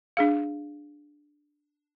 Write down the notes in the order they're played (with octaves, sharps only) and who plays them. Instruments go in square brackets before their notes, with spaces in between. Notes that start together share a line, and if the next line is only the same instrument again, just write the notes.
[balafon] D4 G#4 F5